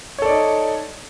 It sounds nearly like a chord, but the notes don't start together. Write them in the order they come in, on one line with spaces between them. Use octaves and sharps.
C#5 A4 D5 D#4